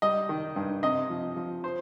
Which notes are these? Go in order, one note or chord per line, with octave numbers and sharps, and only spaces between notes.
G3 D#5
D#3
G2
C3 D#5
F3
F3
C5